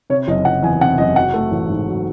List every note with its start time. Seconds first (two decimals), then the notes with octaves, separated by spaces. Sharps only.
0.10 C3 C#5
0.28 F#1 D#5
0.45 F#1 F#5
0.63 E2 G#5
0.81 C3 F#5
0.98 F#1 D#5
1.16 F#3 F#5
1.34 A3
1.51 A1
1.69 G#2
1.88 F#3